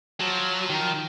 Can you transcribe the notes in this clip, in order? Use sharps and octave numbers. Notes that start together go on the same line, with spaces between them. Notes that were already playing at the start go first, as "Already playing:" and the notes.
F3 F#3
D#3